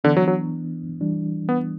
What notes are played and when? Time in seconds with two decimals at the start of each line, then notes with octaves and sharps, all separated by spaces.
0.04 D3 E3 B3 D4
0.17 F#3
0.27 F#3
1.01 E3 G3 D4
1.49 B3